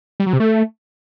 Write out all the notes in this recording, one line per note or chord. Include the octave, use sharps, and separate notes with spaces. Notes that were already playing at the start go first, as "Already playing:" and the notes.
G3
F#3
C3
A3